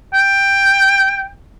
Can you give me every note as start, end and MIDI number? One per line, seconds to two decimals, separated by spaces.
0.14 1.29 79